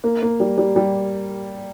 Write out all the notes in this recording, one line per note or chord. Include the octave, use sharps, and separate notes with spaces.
A#3
A#3
G3
G3
G3